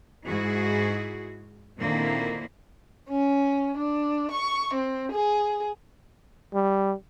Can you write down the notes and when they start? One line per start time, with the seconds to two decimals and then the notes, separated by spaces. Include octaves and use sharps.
0.25 G#2 E4 F#4 G#4
1.80 A#2 D3 D#3 A#3 C4 E4
3.09 C#4
3.77 D4
4.31 C#6
4.73 C4
5.12 G#4
6.54 G3